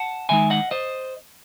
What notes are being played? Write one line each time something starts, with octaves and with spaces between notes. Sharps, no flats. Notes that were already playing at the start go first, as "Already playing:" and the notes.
Already playing: F#5 A5
D#3 G#3 D#4 E5 G#5
D#5 F#5
C5 D#5